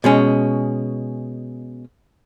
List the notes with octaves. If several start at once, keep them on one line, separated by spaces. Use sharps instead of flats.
B2 G#3 C#4